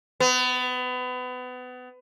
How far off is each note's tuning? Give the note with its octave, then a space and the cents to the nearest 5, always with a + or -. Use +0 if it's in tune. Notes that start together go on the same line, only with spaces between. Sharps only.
B3 +30